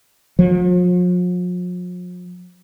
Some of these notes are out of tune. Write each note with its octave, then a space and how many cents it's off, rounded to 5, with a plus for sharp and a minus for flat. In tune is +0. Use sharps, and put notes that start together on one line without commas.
F3 +45